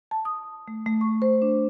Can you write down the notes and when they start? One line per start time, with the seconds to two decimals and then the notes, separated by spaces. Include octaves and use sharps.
0.11 A5
0.25 D#6
0.68 A3
0.86 A3
1.01 C#6
1.22 C5
1.42 D4